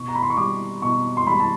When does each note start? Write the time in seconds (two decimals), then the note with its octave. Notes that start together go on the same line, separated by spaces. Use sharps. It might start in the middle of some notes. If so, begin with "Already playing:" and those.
Already playing: B2 C#6
0.08 A#5
0.15 B5
0.23 C6
0.30 C#6
0.37 G3 D6
0.82 B2 C#6
1.17 C6
1.27 G3 B5
1.40 A5